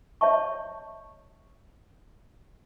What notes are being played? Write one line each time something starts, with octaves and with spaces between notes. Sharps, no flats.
C#5 D#5 E5 A5 C#6